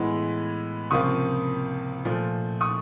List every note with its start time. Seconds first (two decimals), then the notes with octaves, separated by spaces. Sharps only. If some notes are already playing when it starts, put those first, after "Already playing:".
Already playing: A2 E3 G#3 B3
0.91 C#2 C3 F3 A#3 C#6 D#6
2.05 A#2 F3 A3
2.61 C#6 D#6